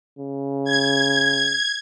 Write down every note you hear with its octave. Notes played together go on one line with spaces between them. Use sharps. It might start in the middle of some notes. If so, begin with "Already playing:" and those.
C#3
G#6